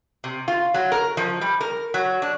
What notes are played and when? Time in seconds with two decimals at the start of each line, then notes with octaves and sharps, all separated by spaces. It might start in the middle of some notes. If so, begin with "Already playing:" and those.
0.24 C3
0.48 F4
0.74 F#3
0.92 A#4
1.17 F3
1.41 G3
1.61 A#4
1.94 F#3
2.22 D4